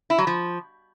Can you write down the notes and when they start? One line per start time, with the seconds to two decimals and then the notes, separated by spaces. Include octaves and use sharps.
0.10 E4
0.18 F#3
0.27 F3